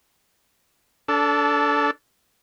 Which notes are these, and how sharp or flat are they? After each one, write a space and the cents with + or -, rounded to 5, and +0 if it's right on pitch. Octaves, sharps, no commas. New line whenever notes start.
D4 -25 A4 +0